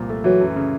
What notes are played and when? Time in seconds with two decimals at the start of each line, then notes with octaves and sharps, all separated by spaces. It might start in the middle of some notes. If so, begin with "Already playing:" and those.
Already playing: C2 A#2 F3
0.09 A3
0.24 E3 F#3
0.41 F#2
0.56 C#3